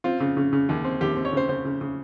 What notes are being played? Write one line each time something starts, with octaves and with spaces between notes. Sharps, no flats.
C4 F4
C#3
C#3
C#3
D#2
C4
D#2 G4
C4
C#5
C#3 C5
C#3 C5
C#3
C#3